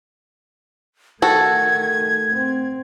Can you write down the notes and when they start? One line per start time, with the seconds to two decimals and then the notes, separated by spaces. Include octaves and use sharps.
1.22 D#3 A3 F#4 A4 G#6
2.32 C4